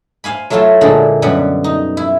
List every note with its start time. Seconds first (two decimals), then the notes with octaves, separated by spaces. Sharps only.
0.24 C5 F5 G#5 B5
0.50 F#3 A3 E4 F4 A4 C5
0.81 A#2 D3 G#3 A#3 E4 A4
1.22 F#2 B2 G3 G4 F#5
1.64 D#4
1.97 E4